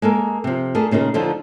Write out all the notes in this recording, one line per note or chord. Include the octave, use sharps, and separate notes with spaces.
G#3 A#3 A4 A#4
C3 F3
A3 D4 G#4 A#4
A#2 C#3 D#4 A#4
D3 F3 D#4 F4